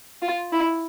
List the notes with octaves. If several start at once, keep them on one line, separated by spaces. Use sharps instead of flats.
F4
E4